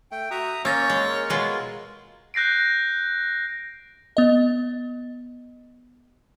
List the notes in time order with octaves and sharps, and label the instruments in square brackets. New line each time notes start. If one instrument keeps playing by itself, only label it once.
[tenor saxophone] A3 [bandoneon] G5
[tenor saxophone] F#4 [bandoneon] E5 A#5 D#6
[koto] A#3 [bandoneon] C#4 G6 [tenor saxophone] C#5 [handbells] E6 A6 A#6
[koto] G#3
[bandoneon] A#4
[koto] B2 G#3 F4
[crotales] F#6 G6 A#6 C7 D7
[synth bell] B3 D#5